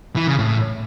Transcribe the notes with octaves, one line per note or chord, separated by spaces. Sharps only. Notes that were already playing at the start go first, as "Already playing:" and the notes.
E3
C#3
A2